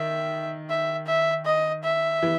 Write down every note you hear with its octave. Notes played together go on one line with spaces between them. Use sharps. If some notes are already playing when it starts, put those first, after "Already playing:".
Already playing: D#3 E5
E5
E5
D#5
E5
E3